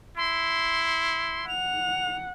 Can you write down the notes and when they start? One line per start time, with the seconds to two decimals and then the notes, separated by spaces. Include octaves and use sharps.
0.17 E4 C6
1.48 F#5 F7